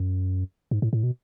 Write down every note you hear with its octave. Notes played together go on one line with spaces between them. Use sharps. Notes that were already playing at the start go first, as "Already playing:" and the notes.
Already playing: F#2
G#2
A2
A2
B2